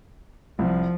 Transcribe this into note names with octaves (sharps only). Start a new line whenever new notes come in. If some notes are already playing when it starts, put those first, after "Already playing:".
C2 F3